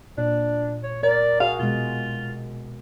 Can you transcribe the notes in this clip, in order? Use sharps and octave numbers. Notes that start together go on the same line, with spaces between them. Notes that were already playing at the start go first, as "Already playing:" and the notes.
A#2 D4
C#5
A#4 D5
F#4 G#4 F5
B2 G#3 F4